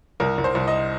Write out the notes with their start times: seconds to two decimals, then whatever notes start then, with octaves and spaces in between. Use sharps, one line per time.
0.20 C2 A#4
0.38 C2
0.44 C5
0.55 C2
0.68 D#5